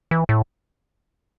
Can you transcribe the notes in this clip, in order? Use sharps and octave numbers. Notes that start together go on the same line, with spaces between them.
E3
A2